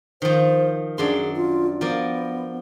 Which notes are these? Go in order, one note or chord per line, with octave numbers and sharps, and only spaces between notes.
D#3 F3 C5
F#2 D4 G#4 C6
F4
F3 B3 A#4 D5